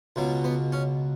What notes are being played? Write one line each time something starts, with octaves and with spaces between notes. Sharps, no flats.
C#2 B2 F#3
B3
C#4